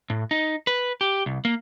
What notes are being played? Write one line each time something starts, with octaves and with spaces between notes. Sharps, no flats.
A2
D#4
B4
G4
C2
A#3